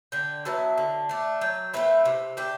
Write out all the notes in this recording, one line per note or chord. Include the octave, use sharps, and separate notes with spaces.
D3 G5
F#3 B3 E4 A5
D3
A3 D4
F#3 G5
A3 C4 E4 B4
C3
D4 G4